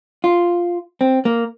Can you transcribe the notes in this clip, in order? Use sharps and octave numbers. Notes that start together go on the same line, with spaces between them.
F4
C4
A#3